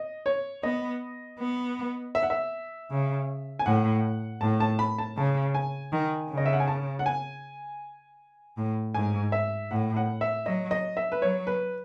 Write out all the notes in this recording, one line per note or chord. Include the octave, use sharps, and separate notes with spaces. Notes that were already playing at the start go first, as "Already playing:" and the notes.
Already playing: D#5
C#5
B3 D#5
B3
E5
F#5
E5
C#3
G#5
A2 F#5
A2 A5
A5
B5
A5
C#3 A5
G#5
D#3
C#3
D#5
E5
F#5
G#5
A5
F#5
G#5
A2
G#2 G#5
E5
A2 F#5
F#5
E5
F#3 D#5
D#5
E5
B4
F#3 C#5
B4